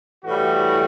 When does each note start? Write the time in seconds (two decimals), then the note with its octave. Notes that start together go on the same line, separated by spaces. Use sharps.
0.23 A2 E3 G3 F#4